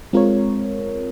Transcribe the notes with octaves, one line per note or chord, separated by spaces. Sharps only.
G#3 C4 F4 A#4 C#5